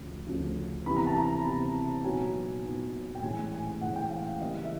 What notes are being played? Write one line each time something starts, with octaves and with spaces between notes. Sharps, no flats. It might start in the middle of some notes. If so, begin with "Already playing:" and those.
Already playing: D2 C#3 F3
D2 C#3 F3
C3 E3 G3 B3 B5
A#5
A5
A#5
C3 E3 G3 B3
A#2 F#3 B3 D#4 G#5
A#2 F#3 B3 D#4
G5
A2 E3 G#3 C#4 G#5
G#5
A2 E3 G#3 C#4 F#5
G5
F5
C#3 E3 G3 A#3 D#5
E5